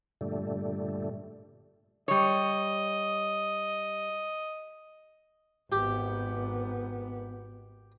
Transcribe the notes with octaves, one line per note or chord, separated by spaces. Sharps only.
G2 A#2 D3 G3 A3
G3 C#5 D#5
G#1 B3 G4